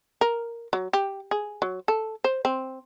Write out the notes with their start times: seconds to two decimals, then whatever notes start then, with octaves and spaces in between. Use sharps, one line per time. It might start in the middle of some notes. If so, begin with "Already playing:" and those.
0.21 A#4
0.73 F#3
0.93 G4
1.31 G#4
1.62 F#3
1.88 A4
2.24 C5
2.45 C4